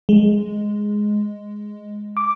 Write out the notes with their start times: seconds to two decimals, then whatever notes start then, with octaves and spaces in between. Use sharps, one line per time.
0.09 G#3
2.17 D6